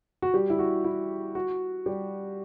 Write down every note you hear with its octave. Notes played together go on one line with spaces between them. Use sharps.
F#4
G3 G4
E4
F#4
E4
F#4
G3 G4